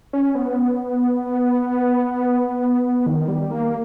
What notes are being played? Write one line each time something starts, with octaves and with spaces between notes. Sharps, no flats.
C#4
B3
D#3
G3
A#3